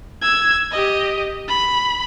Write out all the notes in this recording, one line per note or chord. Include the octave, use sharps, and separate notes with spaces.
E6 G#6
G4 D#5
B5